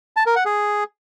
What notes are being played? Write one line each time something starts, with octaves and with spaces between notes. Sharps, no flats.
A5
A#4
F#5
G#4